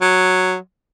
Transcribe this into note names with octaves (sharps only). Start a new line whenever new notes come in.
F#3